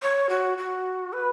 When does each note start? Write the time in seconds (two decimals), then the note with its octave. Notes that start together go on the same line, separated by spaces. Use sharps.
0.02 C#5
0.29 F#4
0.58 F#4
1.13 B4